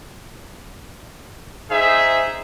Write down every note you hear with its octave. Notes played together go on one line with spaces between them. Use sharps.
D#4 G#4 C5 E5